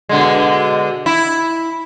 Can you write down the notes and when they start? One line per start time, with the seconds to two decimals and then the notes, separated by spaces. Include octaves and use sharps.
0.09 B2 D3 G#3
1.06 E4